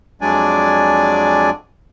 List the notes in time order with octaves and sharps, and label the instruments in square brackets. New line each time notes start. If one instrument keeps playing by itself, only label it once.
[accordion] F2 F#3 G#3 D4 D5 G#5